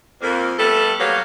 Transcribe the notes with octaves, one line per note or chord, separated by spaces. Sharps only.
F2 A#3
G3 A3 B3 A4
F#3 G3 A#3 B3 C#5 F5